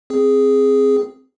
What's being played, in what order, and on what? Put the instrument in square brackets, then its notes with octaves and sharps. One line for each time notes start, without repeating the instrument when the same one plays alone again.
[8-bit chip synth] C4 G#4